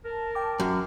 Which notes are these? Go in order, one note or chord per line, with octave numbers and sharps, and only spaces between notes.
A#4 A5
G5 D6
F#2